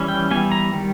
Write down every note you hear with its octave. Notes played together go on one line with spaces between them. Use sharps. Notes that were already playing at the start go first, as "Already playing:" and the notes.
Already playing: E3 G3 C#4
G5
E3 G3 B3 G#5
A#5
D#3 G3